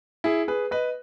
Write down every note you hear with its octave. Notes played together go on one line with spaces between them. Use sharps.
E4 G#4
G#4 B4
B4 D#5